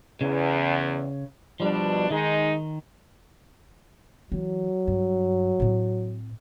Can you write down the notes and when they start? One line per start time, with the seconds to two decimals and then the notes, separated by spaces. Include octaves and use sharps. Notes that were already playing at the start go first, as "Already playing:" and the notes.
0.21 E2 C#3
1.60 B2 F3 G3 D4
2.10 D#3 G#3 D#4
4.32 E3 F#3
4.87 G2
5.60 A2 C4